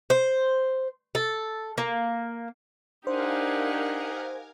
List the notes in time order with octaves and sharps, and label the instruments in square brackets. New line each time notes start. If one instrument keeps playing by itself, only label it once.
[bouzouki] C5
A4
A#3
[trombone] D4 [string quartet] D#4 G4 F#5 [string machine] A#4 F5 G#5 [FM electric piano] C5